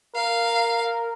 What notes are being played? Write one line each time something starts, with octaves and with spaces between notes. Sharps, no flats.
A#4 F5